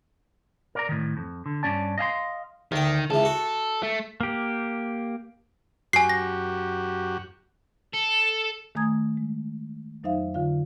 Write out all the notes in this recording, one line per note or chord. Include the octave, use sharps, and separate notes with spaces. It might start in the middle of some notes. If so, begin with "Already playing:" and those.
A#4 D5 A#5
A2 D#3
F2
D3
G2 F3 C#4 D5 A5
D#5 F5 G#5 C6
D2 D#3 G5
C#2 E3 A4
F#4
A3
A#3 G4
F#2 F#4 G4 G#5 C7
A#6
A4
D#3 A3 G#5 A#5 D#6 G#6
G#3
F2 F#3 D#4 C5 E5 F5
D3 F4 F5